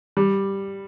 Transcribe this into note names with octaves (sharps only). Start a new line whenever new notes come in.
G3